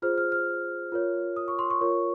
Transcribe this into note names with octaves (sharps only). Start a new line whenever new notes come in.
F4 G#4 C5 F6
F6
F6
F4 A#4 C#5
D#6
C#6
C6
C#6
F4 A#4 C#5